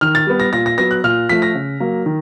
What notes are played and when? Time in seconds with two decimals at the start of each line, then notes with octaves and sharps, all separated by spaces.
0.01 D#3 F6
0.15 A6
0.27 G3 B3
0.40 A#6
0.53 A#2 A#6
0.66 A#6
0.78 F#3 B3 A#6
0.91 F#6
1.04 A#2 F6
1.29 F3 A3 B6
1.42 A#6
1.55 C#3
1.80 F#3 A#3
2.06 D#3